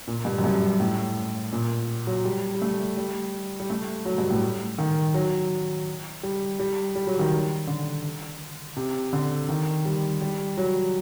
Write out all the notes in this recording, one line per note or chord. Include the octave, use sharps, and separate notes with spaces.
A#2
G2
F#2
G2
A2
A#2
F#3
G3
G3
A3
G3
G3
A3
F#3
G2
A2
D#3
F#3
G3
G3
G3
F#3
D#3
D3
C3
D3
D#3
G3
G3
F#3